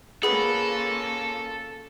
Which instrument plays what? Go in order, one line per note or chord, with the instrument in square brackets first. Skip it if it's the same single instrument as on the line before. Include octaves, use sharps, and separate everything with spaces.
[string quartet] A#3 C#4 F4 [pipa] F#4 B4 [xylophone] G#4 [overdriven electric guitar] A4